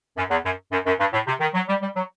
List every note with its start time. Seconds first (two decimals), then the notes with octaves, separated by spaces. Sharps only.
0.17 F#2
0.30 E2
0.44 F#2
0.71 F#2
0.86 F#2
0.99 G2
1.12 A2
1.27 C3
1.40 D#3
1.54 F#3
1.68 G3
1.81 G3
1.95 F#3